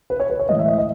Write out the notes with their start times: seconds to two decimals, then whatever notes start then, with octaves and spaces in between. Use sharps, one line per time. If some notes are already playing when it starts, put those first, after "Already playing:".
0.10 B4
0.20 C#5
0.30 B4
0.39 C#5
0.49 A2 E3 G#3 D#5
0.59 E5
0.68 D#5
0.78 D#5